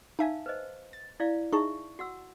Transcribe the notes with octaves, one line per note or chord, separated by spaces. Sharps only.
D#4 E5 F5 G#5 A5
B4 C5 D#5
A6
E4 D5 F5
D#4 G#4 E5 A5 C#6
F#4 F#5 E6